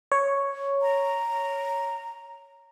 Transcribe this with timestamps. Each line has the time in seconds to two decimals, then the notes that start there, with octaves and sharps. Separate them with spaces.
0.12 C#5
0.82 A#5